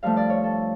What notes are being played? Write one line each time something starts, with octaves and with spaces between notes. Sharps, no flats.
G2 F3 A3 F5
D5
C#5
A4